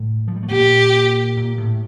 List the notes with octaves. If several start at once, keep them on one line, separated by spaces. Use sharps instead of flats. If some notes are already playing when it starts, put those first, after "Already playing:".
Already playing: A2 A3
F3
G3
A3
A#2 A#3 G4
A#2 A#3
A2 A3